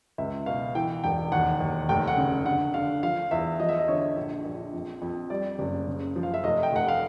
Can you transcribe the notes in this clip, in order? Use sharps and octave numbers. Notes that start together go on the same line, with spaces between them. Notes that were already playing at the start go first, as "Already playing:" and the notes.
C#2 E5
B2 F5
E3 G5
E1 G5
D#2 F#5
D#2
F1 G5
F#5
C#3
D3 F#5
D3 F5
F3 F5
E2 E5
F3 D#5
E5
D#5
D3 C#5
A#1
A#1
F2
F2
G3 D5
F#1
C#3
F3
F5
E5
F1 D#5
G5
F1 F#5
F5